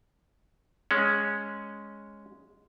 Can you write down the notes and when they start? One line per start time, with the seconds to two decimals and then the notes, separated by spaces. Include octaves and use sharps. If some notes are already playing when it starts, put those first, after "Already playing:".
0.91 G#3 C#4